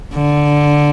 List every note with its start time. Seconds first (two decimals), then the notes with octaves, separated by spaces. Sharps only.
0.14 D3